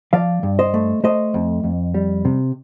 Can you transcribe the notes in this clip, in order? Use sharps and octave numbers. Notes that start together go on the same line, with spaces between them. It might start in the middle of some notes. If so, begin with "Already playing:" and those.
F3 D5 F5
G2
C5 D#5
A3
A3 C5 D#5
F2
F2
G3
C3